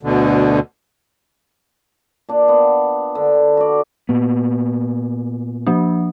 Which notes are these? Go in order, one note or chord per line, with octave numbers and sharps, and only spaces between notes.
D2 B2 D3
A#2 D4
B3
D3
F#4 D5
A#2 B3
F3 A#3 D4